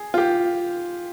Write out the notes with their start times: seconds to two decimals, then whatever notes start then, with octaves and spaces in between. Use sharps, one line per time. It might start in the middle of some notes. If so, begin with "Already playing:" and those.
Already playing: G#4
0.14 F4
0.18 G4